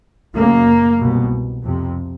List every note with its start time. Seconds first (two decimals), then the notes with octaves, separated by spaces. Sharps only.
0.34 F#2 C#3 A#3
1.00 C2 B2
1.64 F2 C3